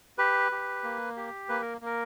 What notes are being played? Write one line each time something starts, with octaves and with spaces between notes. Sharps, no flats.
G4 B4
G4
A#3
G4
A#3 B4
A#4
A#3 A#4